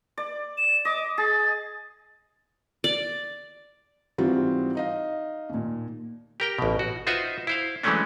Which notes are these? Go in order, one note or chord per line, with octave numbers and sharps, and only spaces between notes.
D5
E7
D#5 D6
G#4 A6
D5
G#2 E3 G3 C4 F4 F#4
D#4 D#5 F5
D#2 A#2
G4 A#4 G5
A1 B2
F#4
D#4 F4 F#4 B4 C5 E5
E4 C5 F5
E3 F#3 G#3 A3 C#4 D4